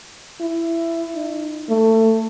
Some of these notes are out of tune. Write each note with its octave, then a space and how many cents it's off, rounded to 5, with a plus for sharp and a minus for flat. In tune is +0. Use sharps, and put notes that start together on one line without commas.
E4 +15
D#4 -35
A3 +20